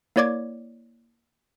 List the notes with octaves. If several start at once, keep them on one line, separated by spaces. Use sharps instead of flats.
A#3 E4 C#5 D5 D6 G#6